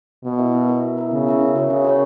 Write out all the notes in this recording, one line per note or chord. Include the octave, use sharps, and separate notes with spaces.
B2 B3
E4 A#4 E5
B3
E4 A#4 E5
B3
E4 A#4 E5
C#3 B3
E4 A#4 E5
C#4
F#4 A#4 C#5
C#3 C#4
F#4 A#4 C#5